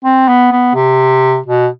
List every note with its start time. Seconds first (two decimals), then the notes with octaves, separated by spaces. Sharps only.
0.04 C4
0.28 B3
0.52 B3
0.75 C3
1.46 B2